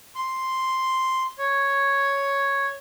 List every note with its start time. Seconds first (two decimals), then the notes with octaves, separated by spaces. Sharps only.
0.15 C6
1.38 C#5